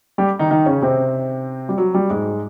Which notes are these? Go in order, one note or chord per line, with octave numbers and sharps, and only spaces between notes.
G3 G4
D#3 D#4
D#3 D#4
C#3 C#4
C3 C4
G3
F#3
G3
G#2 G#3